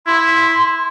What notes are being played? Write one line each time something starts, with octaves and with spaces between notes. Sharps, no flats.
E4 C6